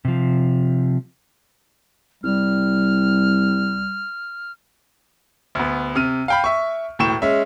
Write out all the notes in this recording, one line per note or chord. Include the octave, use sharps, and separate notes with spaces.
C3 F3
C2 G3 F6
D2 B3
C3 F6 D#7
F5 G5 B5
E5 C#6
E1 A2 G5 C#6 E7
G#3 C#4 E5